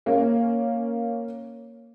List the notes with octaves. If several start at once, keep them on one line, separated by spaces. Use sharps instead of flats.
A#3 C#4